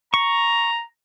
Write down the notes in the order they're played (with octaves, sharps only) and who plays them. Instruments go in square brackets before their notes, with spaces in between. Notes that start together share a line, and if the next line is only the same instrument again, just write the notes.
[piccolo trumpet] A#5 [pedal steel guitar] C#6